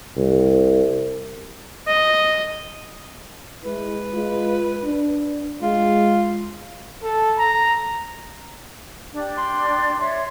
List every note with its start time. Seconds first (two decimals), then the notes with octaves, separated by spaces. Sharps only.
0.16 C2
1.87 D#5
3.64 G#3 E4 B4
4.13 G#3 F4
4.84 D4
5.62 G#3 F4
7.03 A4
7.38 A#5
9.13 D4 G4 D5
9.37 C6
9.99 C#5 E5 C6